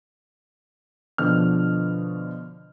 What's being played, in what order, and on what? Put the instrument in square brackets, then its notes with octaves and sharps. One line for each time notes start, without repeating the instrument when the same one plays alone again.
[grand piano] B2 D3 F3 F6